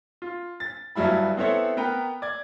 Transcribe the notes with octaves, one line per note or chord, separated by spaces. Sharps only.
F4
A6
G1 G2 F#3 G3 E4 B5
B3 C4 E4 A4 C5 C#5
B3 A#4 B4 G5 A#5
D5 G#6